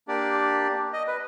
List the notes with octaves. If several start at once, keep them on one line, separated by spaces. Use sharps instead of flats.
A#3 D4 G4 D5
D#5
B4